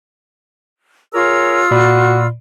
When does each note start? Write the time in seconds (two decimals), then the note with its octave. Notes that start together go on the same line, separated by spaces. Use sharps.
1.14 F4 G#4 A#4 C#5 D#6 E6
1.71 A#2 F#4 D5 B5